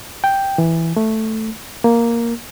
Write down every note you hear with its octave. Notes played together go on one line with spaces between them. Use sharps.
G5
E3
A3
A#3